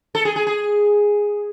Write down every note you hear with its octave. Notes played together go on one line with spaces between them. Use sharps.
A4
G#4
G#4
G#4